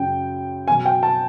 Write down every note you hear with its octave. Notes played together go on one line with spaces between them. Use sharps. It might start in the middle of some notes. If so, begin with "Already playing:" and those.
Already playing: F#2 C#3 F#3 G5
B2 F#3 G#5
G5
A5